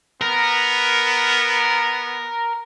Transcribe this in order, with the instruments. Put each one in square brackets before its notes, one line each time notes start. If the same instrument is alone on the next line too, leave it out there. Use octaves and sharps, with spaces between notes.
[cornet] B3 [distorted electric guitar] A#4